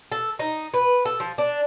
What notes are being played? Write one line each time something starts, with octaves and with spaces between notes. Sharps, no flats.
A4
D#4
B4
A4
F3
D4